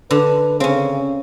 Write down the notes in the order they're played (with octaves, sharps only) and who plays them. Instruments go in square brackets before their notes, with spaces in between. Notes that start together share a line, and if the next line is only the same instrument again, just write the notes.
[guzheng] D3 [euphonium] B4
[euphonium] C#3 [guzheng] C4 C#4